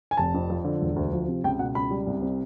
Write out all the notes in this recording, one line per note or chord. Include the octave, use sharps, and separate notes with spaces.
G#5
F1 A5
F2
F3
D3
E1
D2
F3
C3
C#2 G5
B2 F#5
C#2 B5
G3
C2
C3